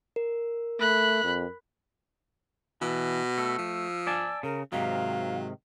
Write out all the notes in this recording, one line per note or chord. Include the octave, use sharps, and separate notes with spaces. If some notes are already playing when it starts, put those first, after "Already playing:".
A#4
A3 B5 F#6
F2
B2 E3
A3 E6
F3
D5 G#5 A5
C#3 A#4
G#2 C3 D#3 F#3 F5